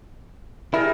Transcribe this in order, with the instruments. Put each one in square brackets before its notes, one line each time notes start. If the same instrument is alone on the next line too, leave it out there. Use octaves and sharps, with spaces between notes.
[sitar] G3 G#4 A#4 [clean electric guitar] E4